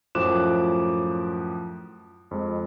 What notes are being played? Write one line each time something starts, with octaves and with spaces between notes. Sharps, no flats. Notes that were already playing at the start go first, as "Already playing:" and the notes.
F#2 A2 F3 D6 F#6 E7
F2 G#3